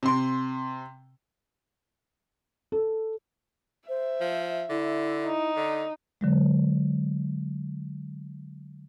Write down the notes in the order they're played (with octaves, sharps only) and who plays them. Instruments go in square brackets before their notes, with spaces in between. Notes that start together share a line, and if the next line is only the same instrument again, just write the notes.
[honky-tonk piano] C3 C6
[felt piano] A4
[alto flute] C5 [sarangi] E5
[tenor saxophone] F3
[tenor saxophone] D3 [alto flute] E4
[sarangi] D#4
[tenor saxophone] D3
[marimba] D3 F#3 G#3